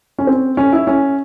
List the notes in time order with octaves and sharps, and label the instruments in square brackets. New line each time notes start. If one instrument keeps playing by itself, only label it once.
[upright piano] C#4
C4
C#4
E4
C#4